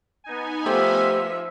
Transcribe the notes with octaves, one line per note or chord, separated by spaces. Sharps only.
B3 D#4 G#5
F3 A3 G4 C5 E5